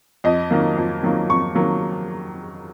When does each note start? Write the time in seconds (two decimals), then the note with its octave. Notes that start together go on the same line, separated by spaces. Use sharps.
0.24 F2 D#5
0.51 D#3 F#3 A#3
0.77 F2
1.03 D#3 F#3 A#3
1.29 F2 C#6
1.55 D#3 F#3 A#3